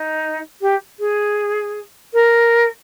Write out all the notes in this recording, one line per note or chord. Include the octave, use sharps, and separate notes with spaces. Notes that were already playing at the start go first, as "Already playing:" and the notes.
Already playing: D#4
G4
G#4
A#4